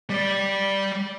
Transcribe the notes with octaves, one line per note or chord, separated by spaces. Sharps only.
G3 D5